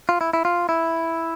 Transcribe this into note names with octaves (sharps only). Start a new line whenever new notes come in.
F4
E4
E4
F4
E4